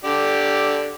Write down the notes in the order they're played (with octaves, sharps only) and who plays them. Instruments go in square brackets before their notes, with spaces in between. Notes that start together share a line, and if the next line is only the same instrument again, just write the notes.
[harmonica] D3 G4 D5